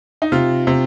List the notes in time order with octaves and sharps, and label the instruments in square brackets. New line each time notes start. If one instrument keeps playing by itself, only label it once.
[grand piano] D#4
C3 F4
C3